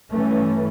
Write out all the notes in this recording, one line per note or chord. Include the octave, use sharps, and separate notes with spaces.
G2 E3 A3 C#4